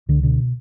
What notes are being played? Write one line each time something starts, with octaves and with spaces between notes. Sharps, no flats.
C#2 D3
B2 D3